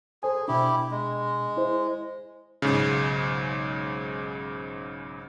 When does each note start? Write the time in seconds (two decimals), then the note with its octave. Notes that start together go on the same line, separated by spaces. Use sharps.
0.23 G#4 A4 C5 G#5
0.48 B2 D4 E4 G4
0.91 G#3
1.57 E4 C5
2.62 B1 G#2 C#3